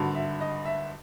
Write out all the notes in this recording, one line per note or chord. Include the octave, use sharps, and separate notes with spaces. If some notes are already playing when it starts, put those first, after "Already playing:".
Already playing: G#1 G2 D3 F#3
E5
D#5
E5